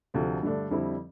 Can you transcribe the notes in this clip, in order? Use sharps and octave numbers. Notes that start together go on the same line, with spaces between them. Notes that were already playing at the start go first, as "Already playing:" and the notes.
D2 C3 F3 A3
G2 D3 A3 D4
F2 D3 G3 C4 E4